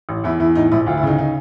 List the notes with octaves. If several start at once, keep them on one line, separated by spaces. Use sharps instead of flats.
A1
E2 E4
E2 E4
A2 D#4
A#1 E4
D2 F4
E4
C#3 D#4
D#4